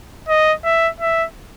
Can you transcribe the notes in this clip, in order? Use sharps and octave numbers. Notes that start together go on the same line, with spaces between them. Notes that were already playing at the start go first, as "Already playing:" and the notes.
D#5
E5
E5